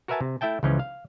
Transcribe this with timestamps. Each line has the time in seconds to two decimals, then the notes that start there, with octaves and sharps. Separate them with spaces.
0.08 F#4 A#4 B4 E5 G#5 A5
0.21 C3
0.41 A3 E4 E5 G5 A5
0.63 C#2 C#3 E3 F3 C#4
0.80 F5